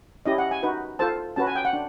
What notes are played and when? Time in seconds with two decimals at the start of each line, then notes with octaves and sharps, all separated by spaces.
0.26 C#4 E4 G4 D#5
0.38 F#5
0.51 G#5
0.63 D#4 F#4 B4
0.99 F4 A4 C5 A5
1.36 C#4 F#4 B4 A5
1.47 G#5
1.56 G5
1.65 F#5
1.73 D4